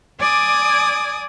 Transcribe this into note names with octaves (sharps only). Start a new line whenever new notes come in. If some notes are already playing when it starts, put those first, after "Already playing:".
D5 G#5 D6 D#6